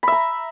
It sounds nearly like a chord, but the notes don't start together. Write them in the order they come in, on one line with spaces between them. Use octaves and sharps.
B5 E5 A#5